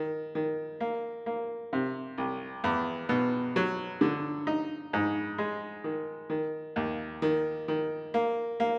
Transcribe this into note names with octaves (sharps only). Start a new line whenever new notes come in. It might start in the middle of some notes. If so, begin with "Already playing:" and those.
Already playing: D#3
D#3
A#3
A#3
C3
C2
E2
B2
F#3
D3
D#4
G#2
G#3
D#3
D#3
D#2
D#3
D#3
A#3
A#3